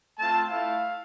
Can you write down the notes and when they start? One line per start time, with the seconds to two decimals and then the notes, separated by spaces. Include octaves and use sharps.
0.19 A3 C4 F4 A5
0.50 A3 E4 F5